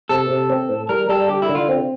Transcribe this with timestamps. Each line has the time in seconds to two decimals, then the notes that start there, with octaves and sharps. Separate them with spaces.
0.09 C3 A4
0.30 C3
0.50 C4
0.69 A2
0.89 G3 A#4
1.09 G3 A4
1.29 D3 G4
1.42 E4
1.49 D3
1.55 F4
1.69 C4